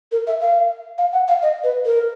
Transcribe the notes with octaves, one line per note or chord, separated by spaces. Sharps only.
A#4
E5
F5
F5
F#5
F5
D#5
B4
A#4